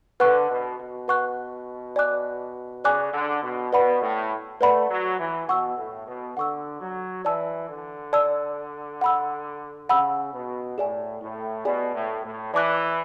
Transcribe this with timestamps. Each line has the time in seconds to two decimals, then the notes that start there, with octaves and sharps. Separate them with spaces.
0.20 D3 B4 F#5 C#6 F#6
0.50 B2
0.79 B2
1.08 B4 F#5 C#6 F#6
1.96 D5 G#5 D6 F#6
2.84 C#3 D5 G#5 D6 F#6
3.14 D3
3.43 B2
3.72 B2 B4 D5 F#5 B5
4.02 A2
4.61 A3 B4 D5 F#5 B5
4.90 F#3
5.19 E3
5.49 B2 F#5 C#6 E6
5.78 A2
6.08 B2
6.37 D3 F#5 C#6 E6
6.81 F#3
7.25 E3 D5 A5 E6
7.69 D3
8.13 D5 A5 E6
9.01 F#5 B5 E6
9.89 C#3 F#5 B5 E6
10.34 B2
10.78 A2 G#4 D5 G#5
11.22 A2
11.65 B2 G#4 D5 G#5
11.95 A2
12.24 A2
12.54 E3 D5 A5 D6 F#6